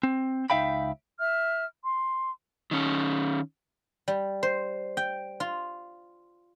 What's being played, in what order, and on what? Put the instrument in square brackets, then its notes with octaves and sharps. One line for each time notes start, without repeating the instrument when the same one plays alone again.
[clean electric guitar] C4
C#2 D#4 E5 F5 G5 B5
[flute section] E5 F6
C6
[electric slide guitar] D#3 C#4
[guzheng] G3
C5
G5
F4